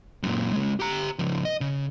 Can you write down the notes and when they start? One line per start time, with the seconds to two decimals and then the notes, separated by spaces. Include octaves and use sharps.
0.23 F#2 A#2
0.53 C#3 G#3
0.80 G4 A#5
1.19 C#3 F3
1.45 D#5
1.61 C#3